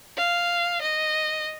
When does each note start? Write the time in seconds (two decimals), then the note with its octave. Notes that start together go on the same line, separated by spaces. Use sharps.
0.17 F5
0.82 D#5